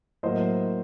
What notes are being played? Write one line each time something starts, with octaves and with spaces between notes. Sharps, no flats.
A2 F#3 A#3 C5 D#5